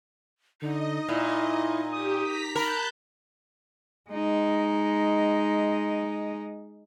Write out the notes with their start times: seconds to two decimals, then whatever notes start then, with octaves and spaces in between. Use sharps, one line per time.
0.62 D3 D#4 D#5
1.09 A#2 E4
1.92 G4 D#6
2.22 A#5 B6
2.56 A#4 A5 B5 F#6 G6
4.10 G#3 D#4